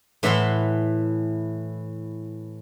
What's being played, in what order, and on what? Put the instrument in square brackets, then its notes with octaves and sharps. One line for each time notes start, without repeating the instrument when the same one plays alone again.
[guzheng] A2 E3 E5 F#5 B5 C6